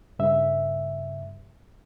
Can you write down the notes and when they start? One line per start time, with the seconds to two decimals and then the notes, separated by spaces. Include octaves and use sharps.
0.19 G2 C#3 E5